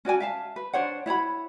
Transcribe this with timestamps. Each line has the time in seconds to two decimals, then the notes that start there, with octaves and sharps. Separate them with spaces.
0.05 C#4 F#4 D5 G#5
0.20 E5 F5 A5
0.56 B4
0.73 D4 C5 C#5 F#5
1.06 E4 C#5 F#5 B5